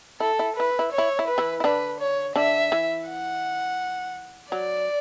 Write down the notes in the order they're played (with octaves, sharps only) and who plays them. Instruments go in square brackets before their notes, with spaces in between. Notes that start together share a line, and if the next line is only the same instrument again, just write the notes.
[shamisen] E4 [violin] A4
[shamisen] E4
[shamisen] E4 [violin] B4
[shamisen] E4
[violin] C#5
[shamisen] E4
E4
[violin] B4
[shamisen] E3 E4
E4
[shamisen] D3 D4 [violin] B4
[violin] C#5
[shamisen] D3 D4 [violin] E5
[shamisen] E3
[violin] F#5
[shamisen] F#3 [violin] D5